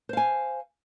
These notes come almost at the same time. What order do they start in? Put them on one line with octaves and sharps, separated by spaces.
C5 F5 G#5